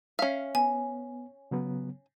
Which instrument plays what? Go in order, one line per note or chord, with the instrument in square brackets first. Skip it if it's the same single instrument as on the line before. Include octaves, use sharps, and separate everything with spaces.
[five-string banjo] C#4 F5 [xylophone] E5
[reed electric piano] B3 [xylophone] G#5
[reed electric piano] C#3 F#3 B3